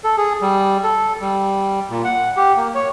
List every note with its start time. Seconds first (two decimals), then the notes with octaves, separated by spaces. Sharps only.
0.04 A4
0.17 G#4
0.42 G3
0.84 A4
1.21 G3
1.90 A#2
2.04 F#5
2.37 G4
2.57 A#3
2.75 C#5